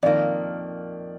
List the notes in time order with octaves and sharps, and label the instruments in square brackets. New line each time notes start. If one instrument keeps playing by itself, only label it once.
[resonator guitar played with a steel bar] F2 D#3 A#3 [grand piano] D5